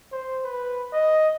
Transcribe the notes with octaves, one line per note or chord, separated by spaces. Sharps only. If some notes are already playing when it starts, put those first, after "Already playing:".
C5
B4
D#5